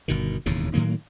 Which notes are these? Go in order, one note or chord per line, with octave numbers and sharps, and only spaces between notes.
G1 B2 D#3
E1 D#2 A2 C#3
A2 D#3 F#3 A#3